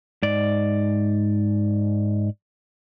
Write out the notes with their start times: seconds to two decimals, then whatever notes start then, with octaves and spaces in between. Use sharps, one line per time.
0.23 G#2 D5